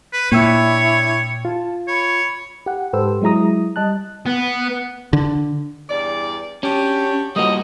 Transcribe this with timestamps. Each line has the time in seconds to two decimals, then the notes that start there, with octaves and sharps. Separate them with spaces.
0.13 B4
0.32 A#2 A#3 D4 E4 C#5 G5 E6 G#6
1.45 F4 A5
1.88 C#5 B5
2.66 G4 F#5
2.93 G#2 G4 A4 B4 C5 E6
3.22 F#3 G#3 E4 A#5 D#6
3.76 G3 D#5 A5 F#6
4.26 B3
5.13 D3
5.89 E2 G2 D5
6.63 C#4 D4 F#4 G4
7.36 A2 F3 G3 A#3 F#4 D#5